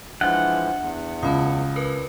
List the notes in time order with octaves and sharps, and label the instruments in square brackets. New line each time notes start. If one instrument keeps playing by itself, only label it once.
[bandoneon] E3 F3 G#3 [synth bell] D4 E5 [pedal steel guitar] F#5
[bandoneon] E2
[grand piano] C#2 [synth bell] A5 B5 D#6
[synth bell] A#4 B4